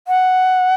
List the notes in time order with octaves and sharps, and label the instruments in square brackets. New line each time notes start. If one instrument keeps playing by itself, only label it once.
[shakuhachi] F#5